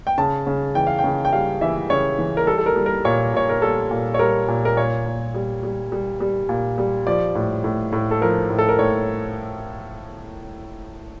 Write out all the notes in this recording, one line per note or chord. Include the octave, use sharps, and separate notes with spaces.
G5
C#3 A5
C#3
E3 G5
F5
G5
C#3
G5
G3 F5
E3 E5
C#3 C#5
E3
A#4
G3 A4
A4
A#4
G3
A#4
A#2 C#5
A#2 C#5
A#4
G3 A4
A#2
C#5
G3 A#4
A#2
A#4
A#2 C#5
A#2
G3
G3
G3
G3
A#2
G3
F3 D5
A2
A2
A2
A4
F3 A#4
A2
A4
A#4
A2 C#5